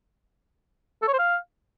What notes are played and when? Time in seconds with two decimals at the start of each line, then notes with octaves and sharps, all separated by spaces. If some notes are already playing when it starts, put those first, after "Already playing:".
1.02 A4
1.08 C#5
1.13 C5
1.19 F5